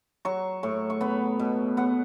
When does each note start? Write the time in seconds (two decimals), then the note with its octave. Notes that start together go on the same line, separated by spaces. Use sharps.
0.25 F#3 C#6
0.63 A2 C#6
0.90 C#6
1.01 B3 B5
1.40 B2
1.77 B3 F#5